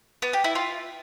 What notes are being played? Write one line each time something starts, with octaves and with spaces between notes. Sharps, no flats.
B3
G4
E4
F4